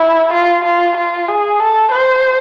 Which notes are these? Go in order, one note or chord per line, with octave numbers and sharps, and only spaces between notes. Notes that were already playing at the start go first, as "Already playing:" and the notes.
Already playing: E4
F4
F4
F4
G#4
A4
C5